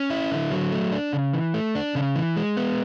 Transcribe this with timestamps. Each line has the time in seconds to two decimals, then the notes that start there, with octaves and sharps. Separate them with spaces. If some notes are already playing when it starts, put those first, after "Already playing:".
Already playing: C#4
0.10 E4
0.31 D3
0.51 F#3
0.72 A3
0.92 D4
1.13 C#3
1.34 E3
1.54 A3
1.75 D4
1.95 C#3
2.16 E3
2.36 G#3
2.57 B3